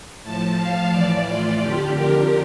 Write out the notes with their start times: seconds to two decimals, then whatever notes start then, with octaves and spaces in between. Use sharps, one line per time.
0.23 A2 F3 A5
0.57 F5
0.91 A2 E3 D5
1.25 F4
1.60 F2 D3 F3 G4
1.94 A#4